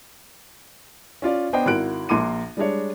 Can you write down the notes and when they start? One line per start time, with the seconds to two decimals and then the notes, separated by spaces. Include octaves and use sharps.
1.22 C#4 F4 D5
1.53 B3 D4 C5 D#5 G5
1.66 G#1 E4 F#4 A#4 F#6 D7
2.09 A#1 A#3 C6 D6 D#7
2.57 G3 G#3 D4 C#5